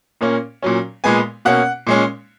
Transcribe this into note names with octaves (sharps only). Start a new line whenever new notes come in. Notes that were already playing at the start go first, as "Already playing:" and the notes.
A#2 A#3 C#4
A#2 F#3 C#4
A#2 G#3 B3 G#5
B2 A#3 C#4 F#5
A#2 G#3 C#4